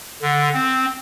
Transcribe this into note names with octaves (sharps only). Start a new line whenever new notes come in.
D3
C4